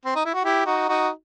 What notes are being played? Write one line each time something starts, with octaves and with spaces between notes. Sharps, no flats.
C4
D#4
E4
F#4
E4 G4
D#4 F#4
D#4 F#4